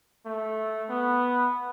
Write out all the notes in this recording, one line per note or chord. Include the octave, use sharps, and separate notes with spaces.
A3
B3